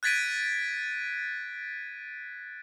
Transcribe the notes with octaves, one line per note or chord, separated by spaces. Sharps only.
F#6 G#6 A6 B6 D7 D#7